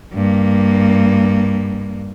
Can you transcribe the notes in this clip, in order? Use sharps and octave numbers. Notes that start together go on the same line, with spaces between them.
G2 A#3